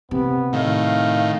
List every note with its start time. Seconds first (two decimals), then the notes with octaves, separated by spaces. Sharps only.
0.11 C3 B3
0.53 A2 D#3 F5